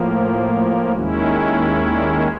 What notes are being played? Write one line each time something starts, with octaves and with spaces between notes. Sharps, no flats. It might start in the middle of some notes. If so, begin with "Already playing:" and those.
Already playing: A2 F3 A#3
D#2 D#3 G#3 C#4 E4 F#4
A#4
D5